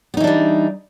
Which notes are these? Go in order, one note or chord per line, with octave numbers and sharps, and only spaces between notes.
E3 G3 B3 D4 D#4